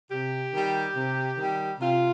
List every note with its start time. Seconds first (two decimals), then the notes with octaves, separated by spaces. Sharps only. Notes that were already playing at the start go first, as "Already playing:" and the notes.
0.10 C3 G4
0.53 D#3 G3
0.96 C3
1.38 D#3 G3
1.80 C3 F4